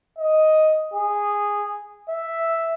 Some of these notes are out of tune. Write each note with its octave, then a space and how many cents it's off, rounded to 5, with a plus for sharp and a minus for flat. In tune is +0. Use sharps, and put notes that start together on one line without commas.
D#5 +5
G#4 -10
E5 +0